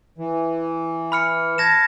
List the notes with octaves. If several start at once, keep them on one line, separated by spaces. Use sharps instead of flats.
E3
B5 F6 C#7
A5 G#6 A#6 E7